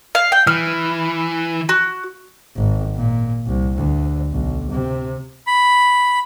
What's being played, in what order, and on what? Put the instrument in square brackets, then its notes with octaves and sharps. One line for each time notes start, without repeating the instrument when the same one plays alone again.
[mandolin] F5
G5
[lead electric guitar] E3 [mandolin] F6
[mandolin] F#4
[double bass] G#1
A#2
C2
D2
B1
C3
[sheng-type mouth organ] B5